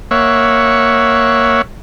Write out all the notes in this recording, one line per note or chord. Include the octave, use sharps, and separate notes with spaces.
A#3 C#5 E5 F#5